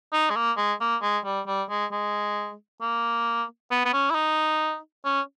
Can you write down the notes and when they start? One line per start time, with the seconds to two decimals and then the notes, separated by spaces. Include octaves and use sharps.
0.13 D#4
0.30 G#3
0.36 A#3
0.57 G#3
0.81 A#3
1.02 G#3
1.25 G3
1.47 G3
1.70 G#3
1.92 G#3
2.81 A#3
3.71 B3
3.85 B3
3.93 C#4
4.10 E4
4.15 D#4
5.05 C#4